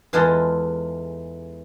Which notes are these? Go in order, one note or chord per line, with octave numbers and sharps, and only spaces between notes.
E2 E3 G#3 F4 A4 D#5